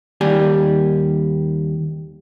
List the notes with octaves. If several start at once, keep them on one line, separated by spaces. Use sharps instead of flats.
D#2 G3 G4 G#5